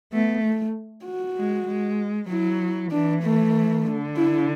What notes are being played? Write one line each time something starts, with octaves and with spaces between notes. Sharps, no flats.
A3 B3
A3
F#4
G#3
G#3
F#3 E4
E3 D4
A3
D3
E4